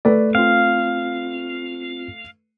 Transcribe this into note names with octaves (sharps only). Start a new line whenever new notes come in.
A3 B4 D5
C4 F4 F5